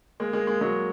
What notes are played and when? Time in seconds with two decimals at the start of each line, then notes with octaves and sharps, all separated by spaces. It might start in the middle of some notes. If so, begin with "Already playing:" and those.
0.20 G#3 A#3
0.33 G#3 A#3
0.47 G#3 A#3
0.61 F#3 G#3